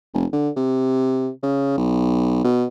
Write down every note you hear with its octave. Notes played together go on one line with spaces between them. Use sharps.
F1
D3
C3
C#3
B1
B2